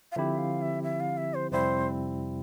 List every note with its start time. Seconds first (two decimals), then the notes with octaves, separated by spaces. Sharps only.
0.12 F5
0.16 D3 F3 C4 E4 G4 E5
0.38 F5
0.62 E5
0.83 E5
1.00 F5
1.17 E5
1.34 C5
1.51 F2 C3 G3 C4 E4 C5